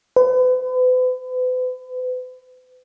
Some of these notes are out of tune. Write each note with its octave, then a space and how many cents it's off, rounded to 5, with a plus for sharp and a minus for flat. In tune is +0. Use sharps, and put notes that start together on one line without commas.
B4 +40